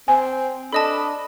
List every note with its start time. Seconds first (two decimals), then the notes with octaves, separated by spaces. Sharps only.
0.08 C4 G#5
0.73 D4 A4 D#5 A5 B5 D#6